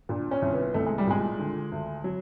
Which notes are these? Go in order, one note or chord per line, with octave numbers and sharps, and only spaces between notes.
A#2 D4
C#4
C2
B3
C2 A3
G#3
G3
A#2 G#3
D3
D2
F#3